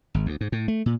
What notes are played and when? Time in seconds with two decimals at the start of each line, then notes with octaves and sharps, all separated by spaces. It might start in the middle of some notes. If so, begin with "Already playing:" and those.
0.14 G#1
0.26 D2
0.41 G#2
0.52 A2
0.68 A3
0.86 A#2